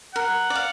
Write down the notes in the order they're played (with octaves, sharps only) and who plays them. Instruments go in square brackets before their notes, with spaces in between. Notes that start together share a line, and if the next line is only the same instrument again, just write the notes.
[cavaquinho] A#4 [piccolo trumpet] F#5
[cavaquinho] D5
F5